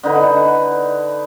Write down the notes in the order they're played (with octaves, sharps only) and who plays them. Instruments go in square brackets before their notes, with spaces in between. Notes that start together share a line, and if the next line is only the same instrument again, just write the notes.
[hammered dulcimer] D3 D#4 B4